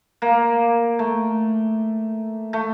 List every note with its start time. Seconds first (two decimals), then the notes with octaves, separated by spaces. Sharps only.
0.22 A#3
0.99 A3
2.53 A3